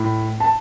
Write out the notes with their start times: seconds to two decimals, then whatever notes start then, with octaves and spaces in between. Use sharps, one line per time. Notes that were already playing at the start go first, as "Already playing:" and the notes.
Already playing: A2 B5
0.40 A5